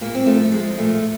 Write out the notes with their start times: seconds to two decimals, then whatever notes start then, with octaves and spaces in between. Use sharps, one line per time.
0.01 A#2 A#3
0.15 C4
0.26 F3 A3
0.40 A3
0.52 F3 G#3
0.78 A#2 A3